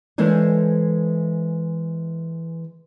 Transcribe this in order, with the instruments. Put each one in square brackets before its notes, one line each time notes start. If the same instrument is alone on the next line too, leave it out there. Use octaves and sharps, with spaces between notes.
[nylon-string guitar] E3 G#3 A4 C5 C#5